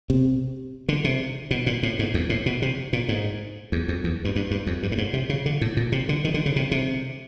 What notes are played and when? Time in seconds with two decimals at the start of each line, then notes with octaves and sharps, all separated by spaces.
0.10 C3
0.89 D3
1.04 C3
1.51 B2
1.66 A#2
1.83 A2
1.99 G#2
2.14 E2
2.29 A2
2.46 B2
2.62 C3
2.93 A#2
3.08 G#2
3.72 E2
3.88 F2
4.04 E2
4.25 G2
4.36 G2
4.51 G2
4.67 F2
4.83 G2
4.92 A2
4.98 G#2
5.13 C3
5.29 C#3
5.46 D3
5.61 A2
5.77 A#2
5.92 C3
6.09 D3
6.24 D#3
6.34 D3
6.46 C#3
6.56 C3
6.71 C3